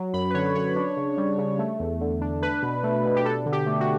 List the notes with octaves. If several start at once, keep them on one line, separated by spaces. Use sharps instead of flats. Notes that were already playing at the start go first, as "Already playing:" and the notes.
Already playing: F#3
F#2 B5
B4
D3 C#5
F#2 C#5
D4
C#3
G3
C#3
A3
E2
D3
D4
D4 B4
B2
A3
B2
G4
D4 A4
D3
G4
A3
F#4